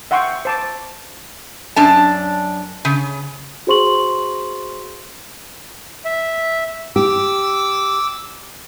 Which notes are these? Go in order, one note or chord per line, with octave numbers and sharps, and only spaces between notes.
E5 F#5 G5 C6 C#6
C5 A5 D6
F#2 D4 A5
C#3
F#4 G#4 C5 C6 C#6 F#7
E5
G4 D6 E6